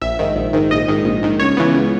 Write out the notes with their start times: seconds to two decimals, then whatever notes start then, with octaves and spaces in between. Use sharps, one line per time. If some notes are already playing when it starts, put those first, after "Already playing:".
0.02 A#1 E5
0.19 G#2 D#3
0.36 A#1
0.53 G#2 D#3
0.71 A#1 D#5
0.88 G#2 D#3
1.05 A#1
1.22 G#2 D#3
1.40 C#2 C#5
1.57 C#3 E3 B3
1.74 C#2